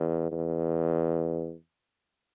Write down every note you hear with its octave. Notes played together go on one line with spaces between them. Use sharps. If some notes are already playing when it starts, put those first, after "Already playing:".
Already playing: E2
E2